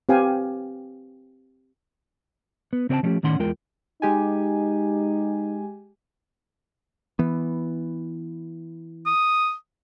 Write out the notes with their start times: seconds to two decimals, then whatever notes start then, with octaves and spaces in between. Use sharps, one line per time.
0.09 C4 G4 B4 F5 G5 G#5
2.73 B3
2.89 C#3 C4 A#4 C#5 G5 A5
3.03 F3 G3 A3 C#4 G4
3.23 A2 D#3 C#4 F#5 C6
3.39 E2 G#3 F4 A#4 G5
4.02 G#3 D#4 G4 G#5
7.19 E3 B3
9.06 D#6